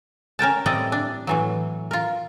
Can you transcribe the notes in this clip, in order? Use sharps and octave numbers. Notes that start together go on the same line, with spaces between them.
C#4 A#4 G5 A5
A2 G3 C4 E4 D5 D#5
D4
A2 E3 F#3
F4 A#4